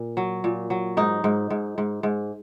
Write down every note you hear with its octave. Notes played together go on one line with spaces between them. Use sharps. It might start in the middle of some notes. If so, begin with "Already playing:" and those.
Already playing: A#2
F#3
A#2
F#3
G#2 D#4
G#2
G#2
G#2
G#2